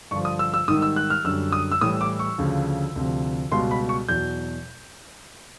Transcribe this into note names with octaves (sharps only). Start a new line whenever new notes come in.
G2 D3 F3 C#6
D#6
E6
E6
G#2 D#3 G3 D#6
E6
F#6
F6
F#2 D3 G3 E6
D#6
E6
A2 E3 G3 D#6
D6
C#6
D2 C#3 F3
D2 C3 F3
C#2 B2 G3 C6
B5
C#6
E2 B2 F#3 G6